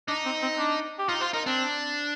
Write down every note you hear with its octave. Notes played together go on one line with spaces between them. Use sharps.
D4 D#4
C4
C4
D4
G4
D#4 F4
F4 C5
D#4 A#4
C4 D4